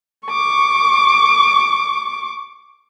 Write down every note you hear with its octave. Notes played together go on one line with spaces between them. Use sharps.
C#6 D6